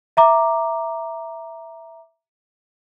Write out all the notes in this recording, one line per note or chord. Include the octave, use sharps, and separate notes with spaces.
E5 A#5 D6